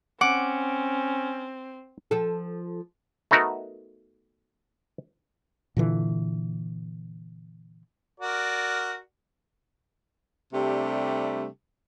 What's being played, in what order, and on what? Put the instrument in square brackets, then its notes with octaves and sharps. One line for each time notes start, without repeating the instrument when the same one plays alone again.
[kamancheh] C4 [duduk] C#4 [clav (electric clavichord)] F#5 [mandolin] D6
[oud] F3 A4
[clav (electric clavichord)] A3 B3 D#4 F#4 A#4
[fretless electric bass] A#2 D3 E3
[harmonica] F#4 A#4 D5
[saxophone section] C3 G3 A3 D4 G4